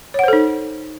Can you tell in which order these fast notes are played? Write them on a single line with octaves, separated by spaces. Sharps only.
C#5 F#5 C5 A4 D#4